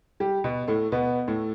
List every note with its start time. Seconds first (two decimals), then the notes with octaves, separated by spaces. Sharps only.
0.20 G3 G4
0.44 B2 B3
0.68 A2 A3
0.92 B2 B3
1.27 A2 A3